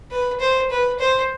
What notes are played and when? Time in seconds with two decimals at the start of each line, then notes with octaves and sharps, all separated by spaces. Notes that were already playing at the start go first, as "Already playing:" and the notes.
0.11 B4
0.40 C5
0.71 B4
0.99 C5